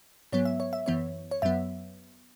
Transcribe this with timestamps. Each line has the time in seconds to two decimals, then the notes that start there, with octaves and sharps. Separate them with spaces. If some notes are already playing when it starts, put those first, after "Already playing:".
0.32 G#2 F#3 B3 C#5
0.45 E5
0.60 C#5
0.73 E5
0.86 F#2 E3 B3 C#5
1.31 C#5
1.42 F#2 F#3 B3 E5